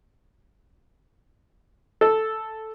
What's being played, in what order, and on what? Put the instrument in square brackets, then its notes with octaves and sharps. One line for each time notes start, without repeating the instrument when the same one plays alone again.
[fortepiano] A4